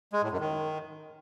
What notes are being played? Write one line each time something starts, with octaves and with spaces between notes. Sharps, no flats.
G#3
A2
F#2
D#3